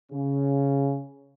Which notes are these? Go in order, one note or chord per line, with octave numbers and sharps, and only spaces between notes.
C#3